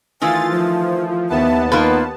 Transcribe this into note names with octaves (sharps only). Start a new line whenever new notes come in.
D#3 E3 A3 F4 G#5 A6
F3 F4
D#2 B3 E5 A5
A#3 D#4 F4 B4